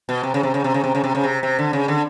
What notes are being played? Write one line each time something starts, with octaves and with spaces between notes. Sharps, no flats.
B2
C3
C#3
C3
C#3
C3
C#3
C3
C#3
C3
C#3
C3
C3
D3
C#3
D3